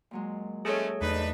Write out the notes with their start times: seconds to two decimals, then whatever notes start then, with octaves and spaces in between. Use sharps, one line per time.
0.11 A#2 F#3 G#3
0.65 G#3 A3 C#4 G#4 A4 C#5 E5
1.01 E2 A3 D4 D#4 B4